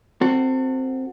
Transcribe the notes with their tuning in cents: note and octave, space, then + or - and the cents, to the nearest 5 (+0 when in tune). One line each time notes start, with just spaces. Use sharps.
C4 +0 F#4 +0 A4 +35